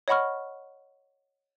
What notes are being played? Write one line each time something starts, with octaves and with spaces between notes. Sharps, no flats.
C#5 D#5 F#5 B5 C#6 F6